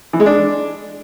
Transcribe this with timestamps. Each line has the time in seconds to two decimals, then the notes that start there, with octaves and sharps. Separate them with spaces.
0.13 E3
0.20 G#3
0.26 D4